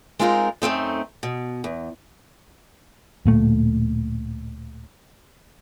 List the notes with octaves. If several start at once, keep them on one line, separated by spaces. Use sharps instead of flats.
G#3 C4 D#4 F4 F#4 A#4
F#2 A3 C4 D#4
B2
E2
D1 A#2 A3